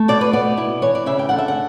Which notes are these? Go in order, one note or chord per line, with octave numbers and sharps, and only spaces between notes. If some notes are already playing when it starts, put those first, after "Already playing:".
Already playing: A3
B2 D5
B4
B3 D5
E4
E3 C#5
D5
C#3 E5
G5
D3 F#5
E5
F#5